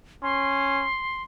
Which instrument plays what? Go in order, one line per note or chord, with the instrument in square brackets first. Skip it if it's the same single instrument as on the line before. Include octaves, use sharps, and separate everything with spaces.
[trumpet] C#4 [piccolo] C6